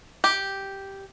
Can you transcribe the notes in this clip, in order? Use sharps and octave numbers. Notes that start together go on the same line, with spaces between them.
G4